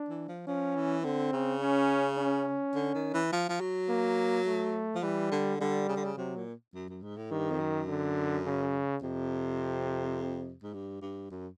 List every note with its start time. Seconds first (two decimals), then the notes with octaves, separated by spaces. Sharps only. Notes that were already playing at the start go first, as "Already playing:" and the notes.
Already playing: D4
0.09 E3
0.28 F3
0.47 F3 C#4
0.76 E3
1.04 D3 C4
1.33 C#3
1.61 C#4
2.18 C#4
2.75 D3
2.94 D#3
3.14 E3
3.32 F3
3.49 F3
3.60 F#3
3.89 A#3
4.46 A3
4.95 F3
5.03 E3 G3
5.31 D3
5.60 D3 G3
5.89 C#3
5.96 D3
6.05 C#3
6.17 C3 F#3
6.36 A#2
6.74 F#2
6.89 F#2
7.02 G#2
7.17 A2
7.31 G2 D#3
7.50 F2
7.59 F#2
7.88 D3
8.46 C#3
9.02 F2 C3
10.63 G#2
10.74 G2
11.01 G2
11.31 F#2